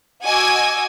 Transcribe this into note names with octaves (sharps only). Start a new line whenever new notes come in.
F#4 D#5 G#5 D6 E6 G#6